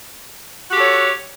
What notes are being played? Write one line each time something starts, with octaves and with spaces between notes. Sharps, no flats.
F#4 G4 A4 C#5